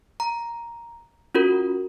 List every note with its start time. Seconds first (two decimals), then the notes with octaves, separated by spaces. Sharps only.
0.20 A#5
1.35 C#4 F4 F#4 A#4